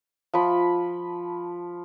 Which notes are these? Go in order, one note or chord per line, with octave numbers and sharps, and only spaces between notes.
F3 B5